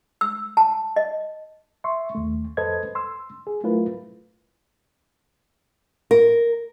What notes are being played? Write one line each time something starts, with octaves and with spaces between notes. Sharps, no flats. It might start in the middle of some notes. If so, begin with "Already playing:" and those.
E6
A5
D#5
E5 C6 C#6
D#2 A3
F2 A4 B4 C5 D#5 G#6
C6 E6
G#4
F#3 A3 E4 F4 A#4 B4
A#4